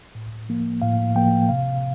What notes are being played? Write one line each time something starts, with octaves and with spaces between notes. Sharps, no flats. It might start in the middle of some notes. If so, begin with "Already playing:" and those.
A2
F3 A#3
A2 F5
F3 A#3 G5
C3 F5